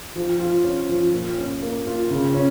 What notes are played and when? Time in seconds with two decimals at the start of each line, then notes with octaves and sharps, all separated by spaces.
0.16 F3
0.40 F4
0.64 C#4
0.89 F3
1.13 A#2
1.38 C#4
1.62 A#3
1.86 F4
2.10 C#3
2.34 C#4